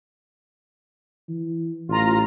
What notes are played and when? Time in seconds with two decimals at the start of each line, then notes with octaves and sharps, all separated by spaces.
1.29 E3
1.89 A1 F4 A#5